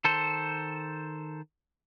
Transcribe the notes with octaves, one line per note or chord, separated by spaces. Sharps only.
D#3 A4 C5